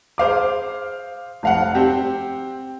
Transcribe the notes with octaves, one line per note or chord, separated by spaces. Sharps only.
G#4 C5 F5 D6
F1 F5 F#5
C4 G4